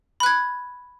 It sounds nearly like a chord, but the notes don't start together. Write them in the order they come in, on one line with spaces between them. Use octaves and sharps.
B5 F#6 G#6